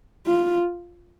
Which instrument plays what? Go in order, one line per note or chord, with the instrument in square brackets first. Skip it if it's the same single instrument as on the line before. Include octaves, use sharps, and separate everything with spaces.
[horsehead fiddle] F4